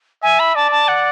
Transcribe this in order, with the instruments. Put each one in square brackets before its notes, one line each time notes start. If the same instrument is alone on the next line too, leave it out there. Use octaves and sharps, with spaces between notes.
[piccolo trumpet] E5 [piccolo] G#5
[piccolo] B5
[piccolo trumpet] D5 [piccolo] A5
[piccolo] A5
F#5